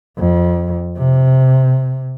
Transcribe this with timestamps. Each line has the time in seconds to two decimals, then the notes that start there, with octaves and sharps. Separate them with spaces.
0.18 F2
0.97 C3